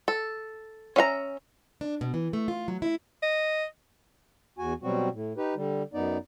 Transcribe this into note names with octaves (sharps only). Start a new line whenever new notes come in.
A4
C#4 E5 F5 A#5
D4
B2
E3
A3
F4
F#3
E4
D#5
E2 F#4 G#5
B2 F#3 G3 C4 F#4
A2
D#4 G4 B4
D3 G3
F#2 B3 D#4 D5